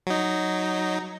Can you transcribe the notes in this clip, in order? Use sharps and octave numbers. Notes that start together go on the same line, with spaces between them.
F#3 D#4